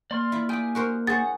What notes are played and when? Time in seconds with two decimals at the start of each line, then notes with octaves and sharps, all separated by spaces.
0.11 A#3 D5 C6 F6
0.32 E4 F4
0.49 G4 D5 G5 G#5 D#6
0.75 F#4 A#4 C5
1.07 G#4 C5 C#5 F#5 A6